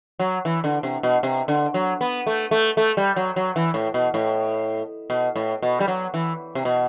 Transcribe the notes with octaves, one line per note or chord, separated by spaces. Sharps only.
F#3
E3
D3
C3
B2
C3
D3
F#3
B3
A3
A3
A3
G3
F#3
F#3
E3
A2
B2
A2
B2
A2
B2
G3
F#3
E3
C3
B2